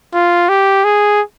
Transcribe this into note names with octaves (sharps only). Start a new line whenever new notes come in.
F4
G4
G#4